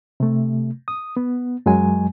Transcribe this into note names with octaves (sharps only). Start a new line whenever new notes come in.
C3 A3
D#6
B3
F#2 F#3 G#3 G#5